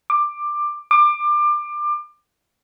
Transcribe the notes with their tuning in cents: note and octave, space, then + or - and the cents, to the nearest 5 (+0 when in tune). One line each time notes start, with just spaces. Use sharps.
D6 +15
D6 +25